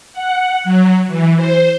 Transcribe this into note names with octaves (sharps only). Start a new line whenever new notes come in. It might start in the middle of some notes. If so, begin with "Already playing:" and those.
F#5
F#3
E3
C5